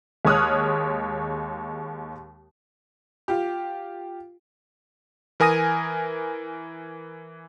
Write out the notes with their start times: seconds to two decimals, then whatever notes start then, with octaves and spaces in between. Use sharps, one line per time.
0.25 D#2 G#3 C#5 D#6 F6 F#6
3.28 F4 G4
5.40 E3 A#4 G#5 D#6 A#6 D#7